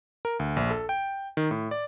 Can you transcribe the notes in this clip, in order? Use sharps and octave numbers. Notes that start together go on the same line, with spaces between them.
A#4
D2
A#1
A4
G5
D#3
A2
D5